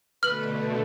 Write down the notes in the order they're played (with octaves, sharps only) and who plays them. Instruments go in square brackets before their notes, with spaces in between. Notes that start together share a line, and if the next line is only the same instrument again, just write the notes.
[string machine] B2 D3 A3 [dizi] B4 [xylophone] F6 F#7